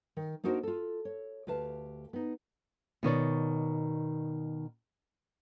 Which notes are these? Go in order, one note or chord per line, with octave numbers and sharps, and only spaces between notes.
D#3
A#3 D4 D#4 F#4 A#4 C5
F4 A4
C#5
D2 G4 B4 F5 A5
B3 D#4
B2 D#3 C#5 D5